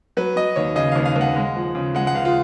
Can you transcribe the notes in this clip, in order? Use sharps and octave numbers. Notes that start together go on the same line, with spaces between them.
F#3 B4
F#3 D#5
D#2 C#5
C#3 D#5
D#2 F5
F5
D#2 F#5
G#3
F3
C#3
G#3 F#5
F#5
C#2 F5
F4